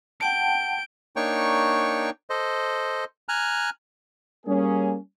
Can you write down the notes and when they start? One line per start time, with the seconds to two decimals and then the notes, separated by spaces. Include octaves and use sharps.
0.21 F#5 G5 A5 G6 D7
1.16 A#3 D4 D#4 C#5 G5 C#6
2.30 A4 C5 D#5
3.29 G#5 A#5 F6 F#6
4.47 G3 A#3 C#4 G#4